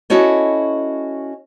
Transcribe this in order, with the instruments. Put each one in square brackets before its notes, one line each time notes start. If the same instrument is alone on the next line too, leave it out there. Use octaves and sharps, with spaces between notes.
[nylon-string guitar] C#4 E4 F#4 A4 C#5 D#5